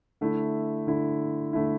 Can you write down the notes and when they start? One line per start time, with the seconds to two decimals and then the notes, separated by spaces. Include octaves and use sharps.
0.21 D3 A3 E4
0.87 D3 A3 E4
1.53 D3 A3 E4